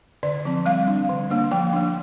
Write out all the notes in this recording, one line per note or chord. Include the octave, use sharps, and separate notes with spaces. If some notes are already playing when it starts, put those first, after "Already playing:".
D3 D5
F3 C4
G3 F5
D4
D3
A#3 D4
F3 G5
A#3 D4